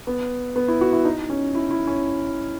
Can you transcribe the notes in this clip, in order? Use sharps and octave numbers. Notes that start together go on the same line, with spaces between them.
B3
B3
E4
F#4
E4
D#4
C#4
E4
E4
C#4